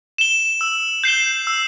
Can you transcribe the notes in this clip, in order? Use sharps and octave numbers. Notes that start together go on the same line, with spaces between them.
E7 G7
E6
G6 C7 E7 G7
E6